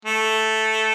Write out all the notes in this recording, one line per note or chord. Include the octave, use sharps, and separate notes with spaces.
A3